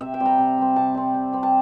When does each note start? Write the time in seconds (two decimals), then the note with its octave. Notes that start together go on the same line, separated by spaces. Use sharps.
0.01 C3 E5
0.14 G5
0.20 G3 C4
0.26 A#5
0.38 C3
0.58 G3 C4
0.76 C3 A5
0.94 G3 C4
1.14 C3
1.32 G3 C4
1.43 A5